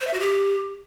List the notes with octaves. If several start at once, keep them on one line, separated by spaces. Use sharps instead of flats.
C5
E5
F#4
G4